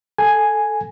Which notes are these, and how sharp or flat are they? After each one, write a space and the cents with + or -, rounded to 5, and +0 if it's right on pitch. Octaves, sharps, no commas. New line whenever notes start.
A4 +0 G#5 +0